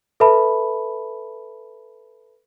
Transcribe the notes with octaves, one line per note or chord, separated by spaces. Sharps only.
A4 B4 E5 A5 B5